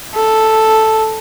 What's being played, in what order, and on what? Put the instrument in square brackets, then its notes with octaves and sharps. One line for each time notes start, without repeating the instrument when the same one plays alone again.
[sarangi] A4